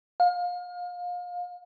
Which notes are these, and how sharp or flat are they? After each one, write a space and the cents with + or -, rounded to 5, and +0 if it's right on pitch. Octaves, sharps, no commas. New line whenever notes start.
F5 +30